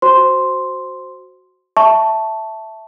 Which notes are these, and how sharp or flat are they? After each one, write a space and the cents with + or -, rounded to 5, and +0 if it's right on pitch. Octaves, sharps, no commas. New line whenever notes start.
F#4 +0 C5 +0 C6 +0
E5 +0 A5 +0 C#6 +0